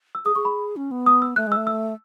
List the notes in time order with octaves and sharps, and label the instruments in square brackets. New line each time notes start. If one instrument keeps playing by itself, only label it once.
[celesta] E6
[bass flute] G#4 [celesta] D#6
[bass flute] G#4 [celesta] C#6
[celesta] B5
[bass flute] C#4
B3
[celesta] D#6
E6
[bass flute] A3 [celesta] F#6
[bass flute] G#3 [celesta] E6
[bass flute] A3
[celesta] E6